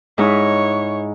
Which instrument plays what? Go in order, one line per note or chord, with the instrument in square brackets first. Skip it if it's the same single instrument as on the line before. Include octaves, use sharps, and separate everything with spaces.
[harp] G#2 D#4 E4 [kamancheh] C#5